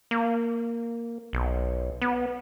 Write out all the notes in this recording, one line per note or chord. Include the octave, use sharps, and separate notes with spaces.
A#3
B1
B3